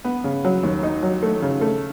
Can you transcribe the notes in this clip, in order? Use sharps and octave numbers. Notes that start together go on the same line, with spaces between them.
B3
C#3
F#3
D#2
D#4
F#3
A3
C#3
A3